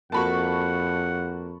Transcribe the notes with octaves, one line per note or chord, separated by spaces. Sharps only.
F2 A#3 F#4 F#5 A5 B5 C#6